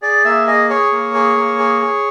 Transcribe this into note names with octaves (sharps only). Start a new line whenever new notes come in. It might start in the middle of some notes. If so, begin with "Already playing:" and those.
G#4 D5
A#3 E5
G#4 D#5
G#4 C#5
A#3
G#4
A#3
G#4
G#4